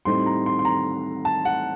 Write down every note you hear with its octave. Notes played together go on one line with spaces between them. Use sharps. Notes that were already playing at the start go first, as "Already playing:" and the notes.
A2 G3 C4 D#4 C6
A#5
C6
C6
A#5
A5
F#5